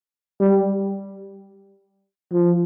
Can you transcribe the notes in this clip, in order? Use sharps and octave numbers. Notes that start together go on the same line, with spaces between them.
G3
F3